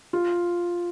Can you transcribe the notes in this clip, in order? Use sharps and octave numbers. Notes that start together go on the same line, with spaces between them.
F4